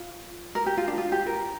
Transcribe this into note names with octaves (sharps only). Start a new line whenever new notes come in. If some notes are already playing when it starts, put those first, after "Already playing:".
Already playing: F4
A#4
G4
F4
D4
F4
G4
A#4